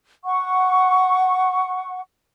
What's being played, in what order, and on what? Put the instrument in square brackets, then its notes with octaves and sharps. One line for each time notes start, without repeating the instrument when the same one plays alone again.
[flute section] F#5 C#6